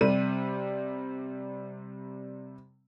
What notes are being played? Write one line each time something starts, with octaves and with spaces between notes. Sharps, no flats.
C3 G3 D#7